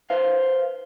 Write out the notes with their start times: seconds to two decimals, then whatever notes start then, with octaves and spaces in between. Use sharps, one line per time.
0.10 B4 C5 F5